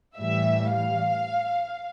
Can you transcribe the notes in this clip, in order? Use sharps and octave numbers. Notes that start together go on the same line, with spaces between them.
A2 E3 G3 E5
F5